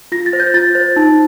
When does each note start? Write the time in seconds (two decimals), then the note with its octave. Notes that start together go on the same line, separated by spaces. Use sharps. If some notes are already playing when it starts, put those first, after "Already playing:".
0.12 F4 A#6
0.26 A6
0.33 C5
0.40 G6
0.54 F4 A6
0.75 C5
0.96 D#4